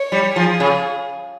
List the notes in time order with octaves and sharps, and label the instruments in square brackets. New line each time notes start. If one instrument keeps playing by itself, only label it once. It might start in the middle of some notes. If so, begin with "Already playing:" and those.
Already playing: [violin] C#5
[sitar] G3
[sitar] F3 [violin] G#4
[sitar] C#3